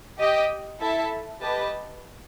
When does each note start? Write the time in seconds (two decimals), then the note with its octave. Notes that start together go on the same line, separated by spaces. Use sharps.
0.18 G4 D#5 G5
0.80 E4 A4 E5 A5
1.42 G4 B4 D#5 A5